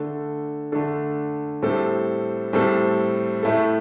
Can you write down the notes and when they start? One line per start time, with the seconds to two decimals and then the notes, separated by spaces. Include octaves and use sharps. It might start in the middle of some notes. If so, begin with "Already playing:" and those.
Already playing: D3 A3 D4 A4
0.72 D3 A3 D4 A4
1.62 A2 G3 C4 A4
2.53 A2 G3 C4 A4
3.43 A2 A3 E4 A4